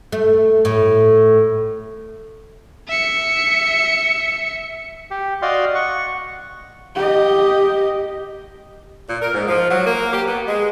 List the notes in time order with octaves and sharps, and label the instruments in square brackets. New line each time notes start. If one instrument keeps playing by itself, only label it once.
[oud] A3
A2
[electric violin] E5 C#7
[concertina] G4
F#4 D5 D#5 F5 C6
F#5 C#6
[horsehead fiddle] G4 D#5
[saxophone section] A#2
A#4
G#2
F3
F#3
A#3
G4
B3
G#3